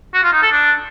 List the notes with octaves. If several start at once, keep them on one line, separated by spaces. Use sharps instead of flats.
F#4
F4
D#4
A4
D4